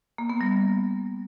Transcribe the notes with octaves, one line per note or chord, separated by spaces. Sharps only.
A#3
B3
G3